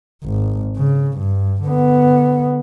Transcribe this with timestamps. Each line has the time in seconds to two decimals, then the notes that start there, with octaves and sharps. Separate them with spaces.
0.24 G#1
0.76 C#3
1.18 G2
1.64 D3 B3